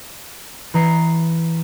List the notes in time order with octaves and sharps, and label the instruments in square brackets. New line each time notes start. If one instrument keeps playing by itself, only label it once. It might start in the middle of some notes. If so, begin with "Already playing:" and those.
[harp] E3 A#5 C7 C#7